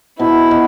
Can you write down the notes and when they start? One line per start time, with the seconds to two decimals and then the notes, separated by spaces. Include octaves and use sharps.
0.19 B2 E4
0.51 B2